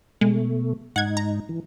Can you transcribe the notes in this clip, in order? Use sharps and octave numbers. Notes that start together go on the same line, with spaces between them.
B2 G#3 A3
G#2 D#4 F#5 G#6
A#5
E3